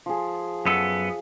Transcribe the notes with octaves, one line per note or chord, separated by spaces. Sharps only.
F3 G#4
F#2 B3 A4